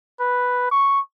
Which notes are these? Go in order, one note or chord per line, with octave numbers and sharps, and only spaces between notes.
B4
C#6